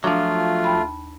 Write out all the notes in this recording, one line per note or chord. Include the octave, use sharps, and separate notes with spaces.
F3 F#3 A3 D4 F4
D#2 A5 B5